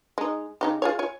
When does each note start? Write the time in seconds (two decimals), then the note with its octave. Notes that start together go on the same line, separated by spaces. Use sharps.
0.18 G#3 D#4
0.61 C#3 D#4 G4
0.82 F4 G#4 C#5
0.99 C#5 G#5